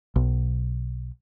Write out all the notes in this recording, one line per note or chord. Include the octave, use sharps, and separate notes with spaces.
B1